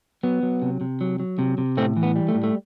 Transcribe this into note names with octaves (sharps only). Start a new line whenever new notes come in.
F#3 B3
F#3
C3
C3
F#3
F#3
C3
C3
A2 A3 C4
E3
B3
G3
A3
A2
A3